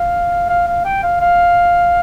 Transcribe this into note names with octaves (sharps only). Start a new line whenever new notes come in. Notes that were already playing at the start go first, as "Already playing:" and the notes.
Already playing: F5
F5
F5
G5
F5
F5